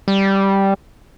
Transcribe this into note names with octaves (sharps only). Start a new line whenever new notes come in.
G3